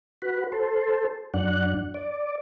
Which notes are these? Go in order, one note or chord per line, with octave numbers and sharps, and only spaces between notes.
F#4 B4
A4 C5
F#2 D4 F#5
D5